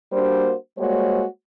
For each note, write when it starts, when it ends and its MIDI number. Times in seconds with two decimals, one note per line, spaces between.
0.12 0.53 55
0.12 0.53 58
0.12 0.53 62
0.12 0.53 66
0.12 0.53 72
0.78 1.24 55
0.78 1.24 56
0.78 1.24 58
0.78 1.24 66
0.78 1.24 72
0.78 1.24 73